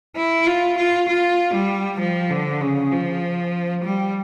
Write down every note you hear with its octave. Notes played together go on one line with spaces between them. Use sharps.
E4
F4
F4
F4
G3
F3
D3
C#3
F3
G3